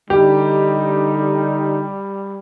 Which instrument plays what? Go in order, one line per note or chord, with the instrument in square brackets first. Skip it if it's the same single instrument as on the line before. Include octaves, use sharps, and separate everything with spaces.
[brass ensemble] D3 D#4 [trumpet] G3 [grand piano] G4